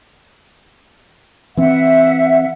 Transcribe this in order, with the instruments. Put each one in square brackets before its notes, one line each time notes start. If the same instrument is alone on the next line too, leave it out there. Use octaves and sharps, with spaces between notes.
[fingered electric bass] E3 C4 [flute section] E5 F#5